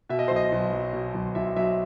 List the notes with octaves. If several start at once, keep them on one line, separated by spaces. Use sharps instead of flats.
B2 E5
D#5
B1 C5
D#5
B1
F#3
B2
B1
B1 E5
F#3 E5